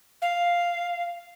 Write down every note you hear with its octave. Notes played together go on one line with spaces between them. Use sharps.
F5